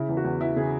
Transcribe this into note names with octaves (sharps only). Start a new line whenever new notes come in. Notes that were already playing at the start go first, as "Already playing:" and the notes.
Already playing: C#3 E4
E2
F#4
E2
E3 E4
C#3 G#4